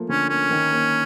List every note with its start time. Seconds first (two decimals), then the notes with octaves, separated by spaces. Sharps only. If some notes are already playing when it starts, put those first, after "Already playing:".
Already playing: F3 A3 A#3
0.09 D3 C#4
0.29 A#3 C#4
0.51 D#3
0.72 A#3